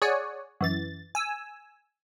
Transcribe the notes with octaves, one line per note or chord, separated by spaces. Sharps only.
G#4 C#5 D5 F#5 G#5
F#2 E3 A6
G#5 E6